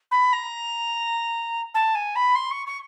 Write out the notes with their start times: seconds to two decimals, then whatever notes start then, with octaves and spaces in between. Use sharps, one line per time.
0.11 B5
0.32 A#5
1.74 A5
1.95 G#5
2.15 B5
2.35 C6
2.50 C#6
2.66 C#6